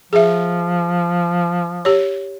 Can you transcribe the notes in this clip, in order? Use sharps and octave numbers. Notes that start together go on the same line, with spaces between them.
F3 G#4 E5
G4 C#5